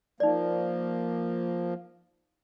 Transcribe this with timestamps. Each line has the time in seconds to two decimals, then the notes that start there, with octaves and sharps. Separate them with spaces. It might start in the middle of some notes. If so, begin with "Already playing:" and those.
0.20 F3 A#3 D#4 D5